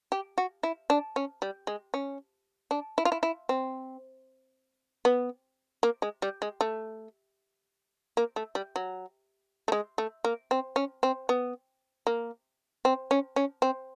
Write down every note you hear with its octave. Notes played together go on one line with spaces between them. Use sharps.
G4
F#4
E4
D4
C#4
G3
G#3
C#4
D4
E4
F4
E4
E4
C4
B3
A#3
G#3
G3
G#3
A3
A#3
A3
G3
F#3
A3
G#3
A3
A#3
C4
C#4
C4
B3
A#3
C4
C#4
C#4
C4